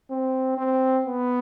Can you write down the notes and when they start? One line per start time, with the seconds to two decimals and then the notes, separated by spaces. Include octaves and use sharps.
0.11 C4
0.57 C4
1.05 B3